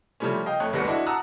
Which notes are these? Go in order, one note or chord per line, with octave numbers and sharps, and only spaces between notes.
C#3 F3 G3 A3 C#4
D#5 F5 G5
F2 A3 C#5 F#6
F#1 D2 G3 B3 A#6 C#7
G#3 D4 E4 F#4
F#5 A5 A#5 D#6 E6 F#6